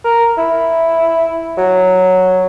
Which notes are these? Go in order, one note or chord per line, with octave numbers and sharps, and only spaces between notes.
A#4
E4
F#3